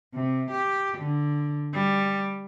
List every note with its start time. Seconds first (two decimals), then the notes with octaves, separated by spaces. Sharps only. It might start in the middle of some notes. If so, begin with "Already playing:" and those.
0.14 C3
0.51 G4
0.98 D3
1.74 G3